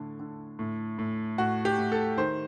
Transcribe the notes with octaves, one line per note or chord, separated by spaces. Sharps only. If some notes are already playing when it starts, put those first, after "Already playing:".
Already playing: A2 D3
D3
A2
A2
A2 F#4
G4
A2
A4
D#3 C5